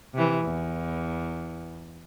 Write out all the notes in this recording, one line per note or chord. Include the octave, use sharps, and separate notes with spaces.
C3 E3
E2